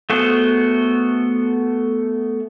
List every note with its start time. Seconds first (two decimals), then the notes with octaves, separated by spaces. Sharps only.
0.10 A3 B3 F#4 G#4 C5